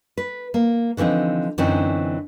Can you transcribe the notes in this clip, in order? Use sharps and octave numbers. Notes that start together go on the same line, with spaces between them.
B4
A#3
D3 E3 F3 C4 D#4
F#2 D3 E3 C4 C#4 D#4